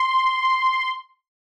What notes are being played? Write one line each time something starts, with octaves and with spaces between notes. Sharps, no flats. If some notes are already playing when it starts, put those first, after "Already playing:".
Already playing: C6